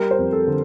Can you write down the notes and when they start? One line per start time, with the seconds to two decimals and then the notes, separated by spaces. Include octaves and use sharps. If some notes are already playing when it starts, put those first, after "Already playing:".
Already playing: G3 A#4
0.11 C5
0.18 F2
0.32 A4
0.47 D3